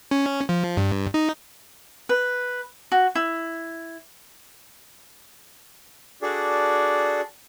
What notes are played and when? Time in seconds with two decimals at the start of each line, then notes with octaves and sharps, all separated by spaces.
0.11 C#4
0.49 F3
0.77 G2
1.14 D#4
2.09 B4
2.92 F#4
3.15 E4
6.22 D4 F#4 G#4 A4 D5